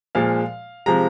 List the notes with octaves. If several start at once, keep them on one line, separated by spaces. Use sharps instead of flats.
A#2 F3 G#3 F5
C3 F3 G#3 A#5